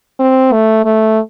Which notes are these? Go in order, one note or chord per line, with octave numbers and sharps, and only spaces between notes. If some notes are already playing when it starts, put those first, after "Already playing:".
C4
A3
A3